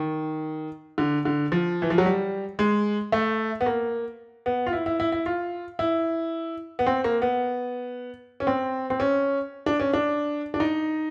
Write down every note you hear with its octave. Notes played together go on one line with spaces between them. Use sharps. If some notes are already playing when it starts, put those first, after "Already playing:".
Already playing: D#3
D3
D3
F3
E3
F3
F#3
G3
G#3
A3
B3
A#3
B3
F4
E4
E4
E4
E4
F4
E4
B3
C4
A#3
B3
C#4
C4
C4
C#4
D4
C#4
D4
D4
D#4